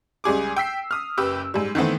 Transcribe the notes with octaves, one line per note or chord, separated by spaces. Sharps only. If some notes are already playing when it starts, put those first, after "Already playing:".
C#2 G3 G#4 D6
G5 E6 B6 C7
D#6 F6
F#1 G4 B4 E6
G#2 G3
D#3 E3 A3 B3 C4